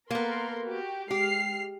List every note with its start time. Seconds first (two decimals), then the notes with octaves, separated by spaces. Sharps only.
0.11 A#3 B3 A4 A#4 C6
0.65 F#4 G4
1.11 G#3 G4 F6 C7